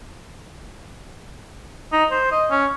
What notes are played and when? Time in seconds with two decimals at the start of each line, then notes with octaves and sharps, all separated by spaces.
1.92 D#4
2.11 C5
2.32 D#5
2.51 C#4